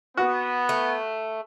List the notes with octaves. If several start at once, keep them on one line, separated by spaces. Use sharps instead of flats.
B3 F#4
A3